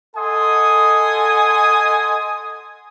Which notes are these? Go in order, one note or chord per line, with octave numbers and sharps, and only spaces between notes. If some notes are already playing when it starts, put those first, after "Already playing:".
A4 D#5 F#5 G#5 C6 D#6